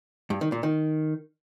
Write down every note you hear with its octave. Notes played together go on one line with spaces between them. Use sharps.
G2
D#3
A#2
D#3